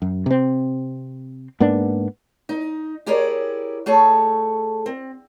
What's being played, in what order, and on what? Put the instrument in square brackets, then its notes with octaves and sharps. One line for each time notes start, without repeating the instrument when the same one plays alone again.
[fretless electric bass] F#2
C3 C4
G#2 A#3 B3 D4
[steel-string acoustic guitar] D#4
E4 G4 G#4 A#4 C#5 D5
A3 G#4 A4 C#5 A5
C4